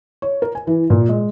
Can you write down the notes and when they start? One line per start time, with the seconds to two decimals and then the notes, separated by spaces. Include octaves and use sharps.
0.22 C#5
0.42 A#4
0.55 G#5
0.67 E3
0.90 A#2
1.09 G#3